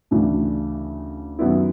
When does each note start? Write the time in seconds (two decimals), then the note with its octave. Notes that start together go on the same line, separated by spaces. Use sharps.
0.11 D2 C#3 E3 A3 D4
1.39 F#2 D#3 F#3 B3 E4